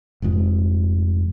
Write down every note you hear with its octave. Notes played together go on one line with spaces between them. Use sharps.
F1 F2 G#2 F3